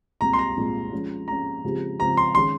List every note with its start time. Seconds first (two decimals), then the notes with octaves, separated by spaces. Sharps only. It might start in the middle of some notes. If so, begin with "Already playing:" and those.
0.21 C2 A#2 G#3 A#5
0.33 C6
0.39 A#5
0.56 C2 A#2 G#3
0.93 F3 G#3 C#4
1.28 F3 G#3 C#4 A#5
1.64 C#3 F3 G#3 C4 G4
2.00 C#3 F3 G#3 C4 G4 A#5
2.17 C6
2.35 D#3 G#3 C#4 G#4 C6